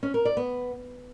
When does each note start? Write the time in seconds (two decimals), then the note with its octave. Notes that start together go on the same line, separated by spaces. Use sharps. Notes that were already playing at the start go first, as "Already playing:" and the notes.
0.03 C#4
0.14 A#4
0.25 D5
0.37 B3